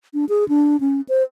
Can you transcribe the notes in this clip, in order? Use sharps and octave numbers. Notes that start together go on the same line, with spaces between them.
D4
G#4
D4
C#4
C5